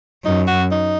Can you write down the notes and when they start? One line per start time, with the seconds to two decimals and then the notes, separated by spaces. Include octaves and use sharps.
0.25 F#2 D#4
0.47 F#4
0.71 D#4